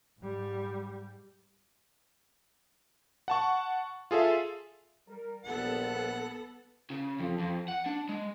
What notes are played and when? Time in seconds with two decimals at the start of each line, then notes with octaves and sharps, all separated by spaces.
0.21 G#2 G3
3.28 F#5 A5 C#6
4.11 F4 G#4 A4 E5 F5
5.08 G3 A#4
5.45 A#1 G3 B3 A4 F#5
6.90 C#3
7.20 F2
7.40 F2
7.68 F#5
7.86 D4
8.09 G#3